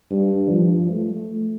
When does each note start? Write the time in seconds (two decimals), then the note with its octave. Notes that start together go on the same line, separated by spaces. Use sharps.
0.11 G2
0.50 F3
0.90 A3